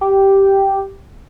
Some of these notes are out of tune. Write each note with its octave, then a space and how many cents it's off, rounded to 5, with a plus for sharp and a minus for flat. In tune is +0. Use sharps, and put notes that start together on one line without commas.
G4 -5